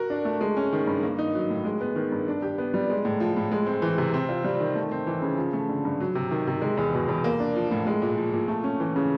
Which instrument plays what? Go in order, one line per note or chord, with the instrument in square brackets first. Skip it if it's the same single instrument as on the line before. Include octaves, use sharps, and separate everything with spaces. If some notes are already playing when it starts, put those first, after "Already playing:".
Already playing: [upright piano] F#4 A#4
D4
A3
G#3
C#4
D#3
G2
A#3
D#4
F#3
A2
G#3
B3
D#3
G2
D4
G4
B3
G3
G#3
A2
F3
A2
G#3
C4
E3
C3
C4
F4
G3
D#3
A3
C4
E3
C#3
F3
A3
D3
G2
F#3
C3
D#3
C3
G#3
E2
B2
E2
A#3
D4
F3
A2
G#3
A#2
F3
A#2
A3
C#4
E3
C#3